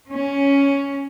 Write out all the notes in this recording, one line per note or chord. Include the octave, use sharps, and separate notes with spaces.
C#4